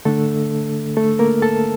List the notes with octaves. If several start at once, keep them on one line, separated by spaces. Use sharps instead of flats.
D3 A3 D4 A4
A3 A4
A#3 A#4
A4 A5